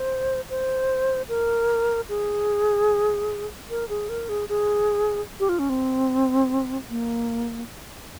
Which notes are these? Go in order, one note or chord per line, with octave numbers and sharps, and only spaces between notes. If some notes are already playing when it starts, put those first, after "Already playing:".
Already playing: C5
C5
A#4
G#4
A#4
G#4
A#4
G#4
G#4
G4
F4
C#4
C4
A#3